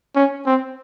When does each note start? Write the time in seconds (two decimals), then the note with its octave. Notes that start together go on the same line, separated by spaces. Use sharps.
0.15 C#4
0.46 C4